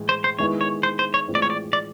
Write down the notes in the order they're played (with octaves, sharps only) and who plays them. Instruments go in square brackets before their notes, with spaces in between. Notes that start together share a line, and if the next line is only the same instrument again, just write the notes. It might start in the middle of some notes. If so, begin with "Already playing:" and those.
Already playing: [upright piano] A2 E3 G#3
[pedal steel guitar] C5
C5
[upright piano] D#3 G#3 B3 E4 [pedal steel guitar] C#5
[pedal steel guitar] C#5
C5
C5
C#5
[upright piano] A2 E3 G#3 C4 F4
[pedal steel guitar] D5
C#5
D5
D5